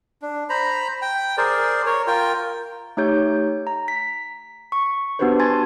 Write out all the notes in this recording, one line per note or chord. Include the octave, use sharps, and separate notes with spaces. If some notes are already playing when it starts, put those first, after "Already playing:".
D4
C5 A#5 B5
G5
G#4 A#4 C5 D5
A#4 C#5
F4 A#4 G5
A3 D#4 G4 C#5 G6
A#5
B6
C#6
B3 D4 F#4 G4 B4 C5
G#5 A5 C6 G#6 A6